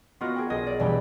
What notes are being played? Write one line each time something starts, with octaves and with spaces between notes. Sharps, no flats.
B3 F4 F#4 A#4 D#5
G#4 G5
B1 G#4 D#5
D5
E1 G3 D4 G4